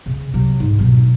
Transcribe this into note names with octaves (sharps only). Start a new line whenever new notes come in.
C#3
C3 F#3
G#2
B2 F#3